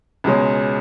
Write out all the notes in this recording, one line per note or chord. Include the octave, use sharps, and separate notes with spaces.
C#2 B2 G#3 C#4